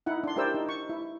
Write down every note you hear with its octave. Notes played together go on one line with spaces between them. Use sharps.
D#4 E4 F#5
D4 C6
E4 G4 A#4 C5 D5 E6
D#4
C#6
E4